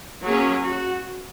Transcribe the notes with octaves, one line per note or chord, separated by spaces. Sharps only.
F#3 A#3 C#4 G#4
F#4